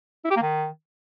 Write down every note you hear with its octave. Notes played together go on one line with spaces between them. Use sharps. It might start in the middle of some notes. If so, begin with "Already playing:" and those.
E4
G4
A#3
D#3